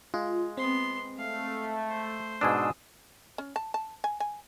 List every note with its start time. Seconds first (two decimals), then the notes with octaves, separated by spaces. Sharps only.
0.14 G#3 F4
0.57 B3 C4 C6
1.18 A3 F5
1.90 C5
2.41 G#2 B2 D4 G#5 D#6 E6
3.38 C#4
3.56 A5
3.74 A5
4.04 G#5
4.20 G#5